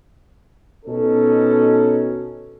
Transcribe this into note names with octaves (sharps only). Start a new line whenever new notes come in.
B2 C#4 D#4 A4